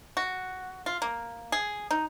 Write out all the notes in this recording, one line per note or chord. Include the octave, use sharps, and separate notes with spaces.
F#4
F4
A#3
G#4
D#4